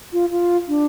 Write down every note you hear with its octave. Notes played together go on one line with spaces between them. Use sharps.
F4
F4
D4